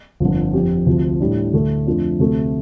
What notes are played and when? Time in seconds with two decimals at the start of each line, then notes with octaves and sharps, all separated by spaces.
0.20 G1 F2 D3
0.54 F2 F3 C4 G4
0.86 D2 C3 F3
1.20 A2 G3 D4
1.53 D2 D3 A3
1.87 F2 F3 A3 D4
2.20 D2 C3 A3